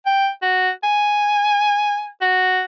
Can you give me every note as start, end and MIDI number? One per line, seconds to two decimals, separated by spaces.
0.06 0.29 79
0.42 0.70 66
0.83 2.07 80
2.22 2.63 66